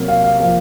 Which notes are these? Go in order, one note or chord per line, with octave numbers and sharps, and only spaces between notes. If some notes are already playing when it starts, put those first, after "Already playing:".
Already playing: C3 F#3 A#3
F5
F5
F3 A#3 F5